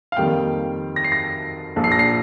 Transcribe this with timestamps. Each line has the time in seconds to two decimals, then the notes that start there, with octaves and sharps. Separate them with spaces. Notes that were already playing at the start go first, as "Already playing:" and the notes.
0.12 F5
0.17 F2 D#3 G3 A#3 G5
0.96 A#6
1.04 C7
1.12 A#6
1.76 A#1 A#2 F3
1.84 C7
1.92 A#6
1.99 C7